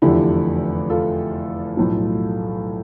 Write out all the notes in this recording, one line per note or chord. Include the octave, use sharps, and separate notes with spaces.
F1 E2 D3 F3 E4 G4
F4 A4
B1 A2 F3